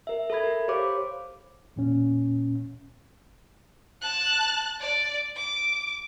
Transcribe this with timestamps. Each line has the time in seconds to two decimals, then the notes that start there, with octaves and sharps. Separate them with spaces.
0.07 A#4 E5
0.30 A4 E5 B5 G#6
0.44 A#4
0.68 G4 C5 C#5 F5 B5 D6
1.76 E2 A#2 C#4
4.02 A5 F#6
4.80 D5
5.36 D6